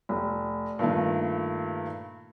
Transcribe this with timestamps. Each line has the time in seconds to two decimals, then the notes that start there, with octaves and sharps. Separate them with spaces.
0.09 F1
0.79 G2 A#2 D#3 A3